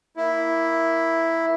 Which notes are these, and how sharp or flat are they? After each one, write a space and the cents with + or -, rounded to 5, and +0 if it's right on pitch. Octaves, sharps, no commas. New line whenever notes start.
A#3 +0 E4 +0